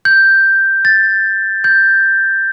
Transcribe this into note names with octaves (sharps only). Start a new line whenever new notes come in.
G6
A6
G6